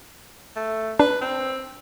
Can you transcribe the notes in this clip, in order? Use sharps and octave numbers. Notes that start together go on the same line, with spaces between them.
A3
D4 B4
C4